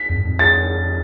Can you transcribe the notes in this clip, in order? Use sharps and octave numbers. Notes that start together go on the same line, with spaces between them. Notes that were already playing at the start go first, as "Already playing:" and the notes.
Already playing: B6
F2
G#2
F2
A6